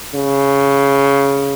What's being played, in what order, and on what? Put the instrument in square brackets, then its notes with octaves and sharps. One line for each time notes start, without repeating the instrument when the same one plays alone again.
[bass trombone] C#3